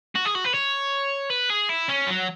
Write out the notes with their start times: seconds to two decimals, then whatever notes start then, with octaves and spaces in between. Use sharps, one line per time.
0.15 F#4
0.25 G#4
0.35 F#4
0.44 B4
0.54 C#5
1.30 B4
1.50 G#4
1.69 E4
1.89 C#4
2.07 F#3